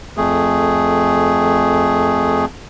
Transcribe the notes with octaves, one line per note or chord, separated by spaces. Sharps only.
F2 A3 G#4